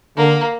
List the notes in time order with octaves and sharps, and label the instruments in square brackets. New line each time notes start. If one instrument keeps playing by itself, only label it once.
[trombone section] D3 [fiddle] A#3